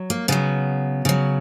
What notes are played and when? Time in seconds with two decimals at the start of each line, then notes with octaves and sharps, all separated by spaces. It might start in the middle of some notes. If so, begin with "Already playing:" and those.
Already playing: F#3
0.10 A#3
0.28 C#3 F#3 B3
1.05 C#3 F#3